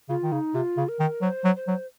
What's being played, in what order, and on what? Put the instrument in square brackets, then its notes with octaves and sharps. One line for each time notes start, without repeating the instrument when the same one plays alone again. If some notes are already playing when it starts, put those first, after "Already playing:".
[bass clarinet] C#3 [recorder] F4
[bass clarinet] D#3
[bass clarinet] C#3 [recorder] D#4
[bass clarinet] C3 [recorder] F4
[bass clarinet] C#3
[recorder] A#4
[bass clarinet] D#3
[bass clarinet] F#3 [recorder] C5
[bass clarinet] F#3
[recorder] C5
[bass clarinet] F#3